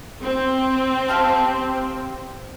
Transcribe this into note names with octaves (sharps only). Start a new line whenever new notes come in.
C4
G4 F5 A5